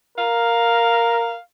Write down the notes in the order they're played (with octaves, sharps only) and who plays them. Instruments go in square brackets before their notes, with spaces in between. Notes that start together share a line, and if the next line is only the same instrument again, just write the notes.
[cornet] A#4 [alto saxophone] F5